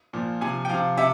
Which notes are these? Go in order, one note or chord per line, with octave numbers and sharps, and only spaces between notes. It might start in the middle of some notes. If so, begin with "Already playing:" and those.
A#2 F3
C3 F3 G#5
G5
C3 F3 F5
C3 E5